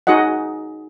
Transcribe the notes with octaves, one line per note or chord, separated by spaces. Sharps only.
D#4 F#4 G#4 D#5 F#5